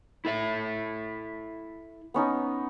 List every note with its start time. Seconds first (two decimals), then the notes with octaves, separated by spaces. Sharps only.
0.25 E4 A4 E5
2.14 B3 C#4 D#4